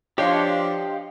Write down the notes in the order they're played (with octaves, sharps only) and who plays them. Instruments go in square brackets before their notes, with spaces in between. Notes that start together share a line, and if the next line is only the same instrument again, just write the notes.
[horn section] F3 D4 [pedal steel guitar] G4 G5 [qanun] C#5 [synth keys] D#5 F5 C6